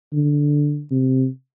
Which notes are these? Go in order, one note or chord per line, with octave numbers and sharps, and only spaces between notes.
D3
C3